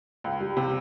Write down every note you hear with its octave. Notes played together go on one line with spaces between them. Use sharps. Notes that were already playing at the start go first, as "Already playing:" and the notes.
C#2
G3
C3